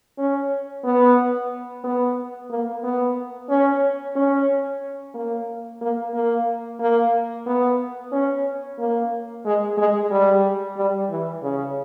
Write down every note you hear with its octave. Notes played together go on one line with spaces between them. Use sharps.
C#4
B3
B3
A#3
B3
C#4
C#4
A#3
A#3
A#3
A#3
B3
C#4
A#3
G#3
G#3
G3
G3
E3
C#3